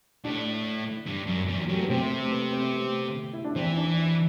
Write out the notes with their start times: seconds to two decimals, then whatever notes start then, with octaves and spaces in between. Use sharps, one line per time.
0.24 A2 D4
1.07 G2
1.28 F#2
1.48 E2
1.60 F#3
1.67 F#2 G3
1.74 A3
1.82 B3
1.90 C3 C4
2.11 A3
2.32 B3
2.53 C4
2.74 A3
3.33 E4
3.44 D4
3.55 E3 C4
3.77 D4
3.97 E4